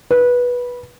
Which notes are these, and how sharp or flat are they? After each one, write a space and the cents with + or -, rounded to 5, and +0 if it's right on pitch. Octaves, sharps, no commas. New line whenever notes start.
B4 -15